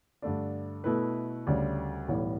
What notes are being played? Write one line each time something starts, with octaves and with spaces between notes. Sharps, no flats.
G2 D3 A3 D4
B2 A3 E4 B4
D2 C#3 G3
B1 A2 E3 G3 B3